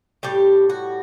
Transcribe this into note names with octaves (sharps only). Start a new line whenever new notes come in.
A2 G3 G4
F#4